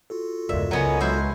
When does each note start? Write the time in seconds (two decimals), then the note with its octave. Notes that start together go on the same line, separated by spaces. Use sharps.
0.10 F4 F#4 A4
0.49 E2 G2 A#2 C#3 G#3 E5
0.71 C#2 F#3 B3 A#4 C#5 D#5 G#5
1.01 B2 F#3 G#3 E4 C5